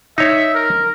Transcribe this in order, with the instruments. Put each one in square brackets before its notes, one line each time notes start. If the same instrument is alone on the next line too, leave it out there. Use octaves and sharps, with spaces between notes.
[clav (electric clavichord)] D#4 C#5 [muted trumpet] E5
[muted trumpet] A#4